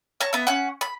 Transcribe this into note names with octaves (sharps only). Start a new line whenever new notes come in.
C#5 A5 A#5
B3 E5
C#4 F#5
B5